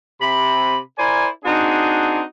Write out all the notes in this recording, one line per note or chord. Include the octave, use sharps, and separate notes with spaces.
C3 B5
E4 A#4 C5 D5 G#5
C4 D4 D#4 F#4 G#4